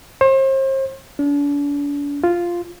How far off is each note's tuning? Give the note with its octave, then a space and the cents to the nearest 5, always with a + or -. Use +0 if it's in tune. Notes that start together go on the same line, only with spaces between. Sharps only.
C5 +40
D4 -40
F4 -5